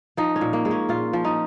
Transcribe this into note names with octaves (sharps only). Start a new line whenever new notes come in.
F3 D#4
C#4
A#2
A#3
G#3
C#4
A#2 F4
F3
D#4